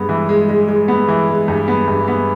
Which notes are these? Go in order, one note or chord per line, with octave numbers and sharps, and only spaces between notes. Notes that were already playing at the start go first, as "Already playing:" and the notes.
Already playing: G2 G#3 B3
E3
G#3
G#3
G#3
B3
E3
G#3
G2
B3
G2
B3